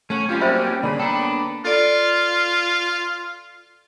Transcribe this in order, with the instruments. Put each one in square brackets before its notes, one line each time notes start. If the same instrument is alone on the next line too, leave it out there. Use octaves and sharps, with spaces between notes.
[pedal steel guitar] A3 F#5 [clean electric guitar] C#4 [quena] C#5
[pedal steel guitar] F#3 A#3 C4 [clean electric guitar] G3 C#4 [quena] F4
[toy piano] C5 E5 B5 [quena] G5
[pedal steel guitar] D3 A#3 G#4 [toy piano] C#5 D5 [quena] B5
[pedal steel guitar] A#3 B3 [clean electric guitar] D4 A4 [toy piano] G5 A#5
[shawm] F4 [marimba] A4 D5